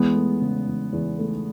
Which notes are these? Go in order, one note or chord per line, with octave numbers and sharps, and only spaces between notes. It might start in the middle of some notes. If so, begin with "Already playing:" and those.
Already playing: E2 G#3 B3
A3
C#3
E2
E2
A3